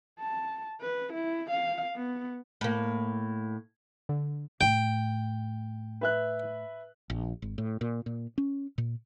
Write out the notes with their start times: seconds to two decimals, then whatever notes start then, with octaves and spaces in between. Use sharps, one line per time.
0.20 A5
0.81 B4
1.13 E4
1.51 F5
1.95 B3
2.61 A2 A#3
4.09 D3
4.61 A2 G5
6.01 B4 E5 F#6
7.10 A#1
7.42 G#1
7.58 A2
7.81 A#2
8.06 A#2
8.38 C#4
8.78 A#2